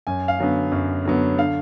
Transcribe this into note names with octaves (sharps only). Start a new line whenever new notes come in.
F#2 G#5
F5
D3 F#3 B3
F#2
D3 F#3 B3
D3 F5